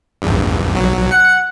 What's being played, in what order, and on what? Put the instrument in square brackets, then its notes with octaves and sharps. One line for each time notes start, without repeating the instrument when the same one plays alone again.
[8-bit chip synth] A#1 E2 G2
B1 F#3
[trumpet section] F#5 [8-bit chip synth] C#7